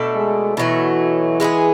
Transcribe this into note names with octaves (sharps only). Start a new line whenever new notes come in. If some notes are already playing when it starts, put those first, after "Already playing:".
Already playing: B2 A3 D4 A4
G#3
B2 E3 F#3 A3
G#3 B3 E4 G#4